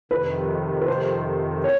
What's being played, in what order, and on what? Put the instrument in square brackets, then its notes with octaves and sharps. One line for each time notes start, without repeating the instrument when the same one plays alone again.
[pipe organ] F2 C3 D#3 [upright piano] B4
[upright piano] B4
C5
C#5